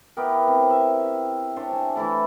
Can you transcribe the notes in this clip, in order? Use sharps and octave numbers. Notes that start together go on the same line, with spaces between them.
B3 E4 G4 A#4
C4
E5
D4 G4 C5 C#5
E5 G#5
E3 A3 E4 A4